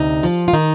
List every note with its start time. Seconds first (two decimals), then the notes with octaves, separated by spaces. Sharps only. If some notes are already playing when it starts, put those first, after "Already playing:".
Already playing: D2 C3 D#4
0.23 F3 F4
0.48 F4
0.53 D#3 D#4